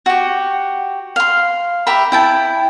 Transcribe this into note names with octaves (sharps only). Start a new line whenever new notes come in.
F#4 G4
F5 C6
G4 E5 A#5 B5
E4 G5 A5